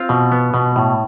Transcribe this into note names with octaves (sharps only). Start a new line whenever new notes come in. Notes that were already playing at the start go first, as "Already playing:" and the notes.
Already playing: C4 F4 F5
B2
B3
B2
A2